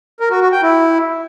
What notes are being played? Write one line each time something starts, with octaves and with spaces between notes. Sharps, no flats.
A#4
F#4
F#4
G5
E4